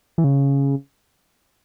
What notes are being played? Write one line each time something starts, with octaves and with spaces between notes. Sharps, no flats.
E3
C#3